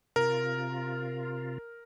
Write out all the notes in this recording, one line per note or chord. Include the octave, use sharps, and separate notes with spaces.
C3 F4 A#4